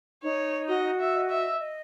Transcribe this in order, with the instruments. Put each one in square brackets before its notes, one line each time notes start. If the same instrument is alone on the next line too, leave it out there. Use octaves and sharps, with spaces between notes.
[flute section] D#4 [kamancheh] C#5
[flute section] F#4 [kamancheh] D#5
[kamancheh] E5
[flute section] D#5
[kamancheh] E5
[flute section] D#5